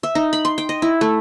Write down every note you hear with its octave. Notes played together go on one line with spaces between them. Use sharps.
E5
D#4
B5
C6
G5
D#5
E4
A3